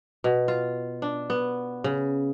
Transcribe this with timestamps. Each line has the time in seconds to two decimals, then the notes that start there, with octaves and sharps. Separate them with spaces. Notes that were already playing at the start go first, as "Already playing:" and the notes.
0.24 B2
0.48 F4
1.02 D4
1.30 B3
1.84 C#3